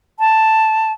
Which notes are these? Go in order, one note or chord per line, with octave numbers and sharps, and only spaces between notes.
A5